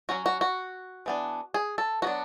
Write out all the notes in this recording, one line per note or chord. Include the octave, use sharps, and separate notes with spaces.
F#3 C#4 F#4
F#4
F#4
E3 B3 D4
G#4
A4
F#3 B3 D4 F#4